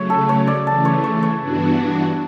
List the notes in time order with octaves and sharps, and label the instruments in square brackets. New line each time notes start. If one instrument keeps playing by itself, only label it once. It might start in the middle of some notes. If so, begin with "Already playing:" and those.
Already playing: [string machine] C#3 F#3 A3 [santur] C#5
[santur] A4
C#5
D5
[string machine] C#3 E3 A3 [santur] A5
[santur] C#5
C#5
C#5
[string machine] G2 E3 B3 D4 F#4